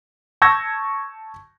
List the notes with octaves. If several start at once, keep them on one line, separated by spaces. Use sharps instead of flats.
A5 C#6 E6 G6 G#6 A#6